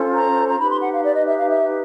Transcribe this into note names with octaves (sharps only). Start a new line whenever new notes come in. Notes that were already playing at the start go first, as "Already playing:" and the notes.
Already playing: C#4 F4 A4 C5
A#5
A#5
D#4 G4 B4 B5
C6
F#5
F5
D5
D#5
E5
F5
E5